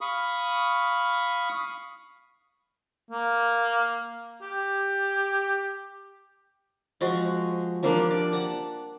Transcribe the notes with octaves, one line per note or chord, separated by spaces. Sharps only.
F5 B5 C#6 D#6
A#3
G4
F3 G#3 F#4
F3 G3 A#3 D4
D5
F#5 A5